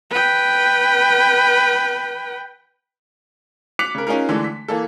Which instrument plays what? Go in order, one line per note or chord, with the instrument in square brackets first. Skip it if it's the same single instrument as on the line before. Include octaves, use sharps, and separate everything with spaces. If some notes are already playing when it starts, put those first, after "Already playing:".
[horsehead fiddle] B4 G5
[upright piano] D6 F#6 B6 C#7 F7 F#7
C#3 A#4
C#4 D#4 F4 G#4 A#4
D3 E3 G#3 A3
B6
E3 A#3 A4